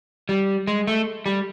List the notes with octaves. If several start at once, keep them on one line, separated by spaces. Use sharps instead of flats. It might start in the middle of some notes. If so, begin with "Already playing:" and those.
G3
G#3
A3
G3